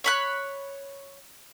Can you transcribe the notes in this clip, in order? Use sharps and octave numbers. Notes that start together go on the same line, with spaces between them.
C#5 B5 F#6